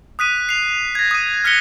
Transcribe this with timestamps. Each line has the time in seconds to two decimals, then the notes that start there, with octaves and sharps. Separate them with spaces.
0.19 D#6 F#6 B6 D#7
0.49 C7 F7
0.95 G#6 A#6
1.11 D#6 D#7
1.44 F6 F#6 A#6 B6 C#7 G7